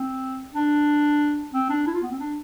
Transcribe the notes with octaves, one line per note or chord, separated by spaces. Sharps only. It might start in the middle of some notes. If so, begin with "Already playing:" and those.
Already playing: C4
D4
C4
D4
E4
F4
B3
C4
D4